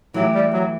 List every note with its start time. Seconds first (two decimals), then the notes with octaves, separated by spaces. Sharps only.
0.14 E3 F#3 A3 E4 G4
0.34 G3
0.53 F#3